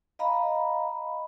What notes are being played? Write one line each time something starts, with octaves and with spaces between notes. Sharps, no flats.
D#5 F5 A#5 B5